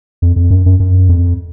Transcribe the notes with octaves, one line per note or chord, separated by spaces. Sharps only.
F2
F2
F#2
F#2
F#2
F2